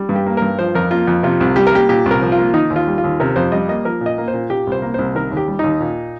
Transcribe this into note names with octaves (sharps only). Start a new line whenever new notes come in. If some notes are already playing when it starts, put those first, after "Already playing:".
Already playing: G3
G2
G4
A#3
G2 A#4
F3 C5
F2 A#4
A#3 F4
F2
C3 F4
C2
G3 G4
A#4
A#3 G4
A#2 G4
C2
A#4
F3
F4
A#3
D#3 D#4
D#2
F4
G3
F4
D#2
C3 A#4
F2 C5
G3 D#5
A#3 D#5
F3 A#4
A#2
D#5
A#3
C5
A#2
A#2 G4
C2
C5
A#3
C2 C5
D#3 A#4
D#2
G4
G3
D#2 D#4
A#2